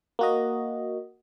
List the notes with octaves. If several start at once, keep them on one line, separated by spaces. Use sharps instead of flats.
A#3 F#4 D#5